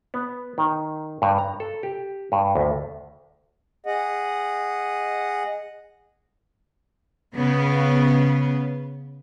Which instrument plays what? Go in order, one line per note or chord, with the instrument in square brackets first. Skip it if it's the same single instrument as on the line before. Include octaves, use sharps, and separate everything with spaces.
[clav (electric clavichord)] B3
D#3
G2
A#5
A4
G4
G2
D2
[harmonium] G#4 D#5 F#5
[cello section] C#3 B3